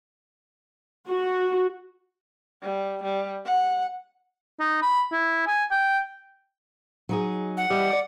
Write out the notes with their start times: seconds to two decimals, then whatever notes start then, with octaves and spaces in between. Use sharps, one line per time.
1.09 F#4
2.63 G3
3.03 G3
3.46 F#5
4.60 D#4
4.82 B5
5.12 E4
5.47 G#5
5.71 G5
7.09 F#3 D#4 G#4
7.57 F#5
7.70 E3 G3 D#5
7.91 D5